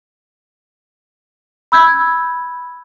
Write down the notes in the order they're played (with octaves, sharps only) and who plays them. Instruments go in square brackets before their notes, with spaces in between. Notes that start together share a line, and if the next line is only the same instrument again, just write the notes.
[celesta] B5 E6 G6 G#6